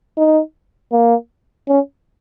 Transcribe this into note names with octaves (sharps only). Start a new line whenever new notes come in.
D#4
A#3
C#4